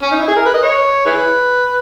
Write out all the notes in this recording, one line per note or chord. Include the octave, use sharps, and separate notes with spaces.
C#4
D#4
E4
G#4
A#4
B4
D#5
C#5
E4 G#4 B4